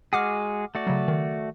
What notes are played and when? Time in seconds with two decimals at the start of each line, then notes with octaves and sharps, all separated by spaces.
0.13 G#3 F#4 G#4 F#5 D6 F6
0.75 A3 F#4 D5
0.87 C#3 F#3
1.08 D#3